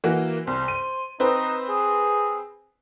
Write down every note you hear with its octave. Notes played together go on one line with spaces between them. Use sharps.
E3 A#3 F#4
C2 C5
D#7
C4 D#4 B4 C5
G#4